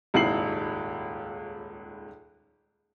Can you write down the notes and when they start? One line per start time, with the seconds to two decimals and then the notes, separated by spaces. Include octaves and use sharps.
0.14 D#1 C#2 G#2 E4 C7 F#7